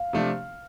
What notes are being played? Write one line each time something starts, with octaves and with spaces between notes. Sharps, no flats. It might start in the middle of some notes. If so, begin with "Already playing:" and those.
Already playing: F5
C3 F3 A3 D4